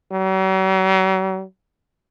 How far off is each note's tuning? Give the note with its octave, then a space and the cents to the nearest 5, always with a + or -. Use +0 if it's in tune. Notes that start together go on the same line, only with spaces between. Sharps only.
F#3 +45